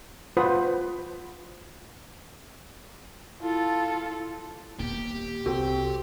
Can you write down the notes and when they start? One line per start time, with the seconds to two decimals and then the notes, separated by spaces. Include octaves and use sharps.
0.37 F4 B4 C5 F#5 B5 D#6
3.41 E4 F4 A4
4.80 D#1 A#3 B3 G4
5.46 C2 C4 F#4 A4